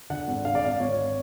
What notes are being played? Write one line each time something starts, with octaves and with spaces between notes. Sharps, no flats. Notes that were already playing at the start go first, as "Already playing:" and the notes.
D3 F#5
G#1
D3 F5
D5
G#1 F5
G#1 C#5